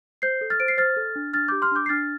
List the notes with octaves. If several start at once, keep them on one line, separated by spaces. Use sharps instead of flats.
C5 G6 C7
A4
F6 A6
C5 D7
C7
C5 F6 A6
A4
D4
D4 F6 A6
G4 D6 G6
C6 F6
D4 D6 G6
C7
D4 F6 A6